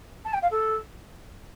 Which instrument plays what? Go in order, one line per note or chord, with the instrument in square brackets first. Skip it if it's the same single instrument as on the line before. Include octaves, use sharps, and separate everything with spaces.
[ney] A5
G5
F5
A4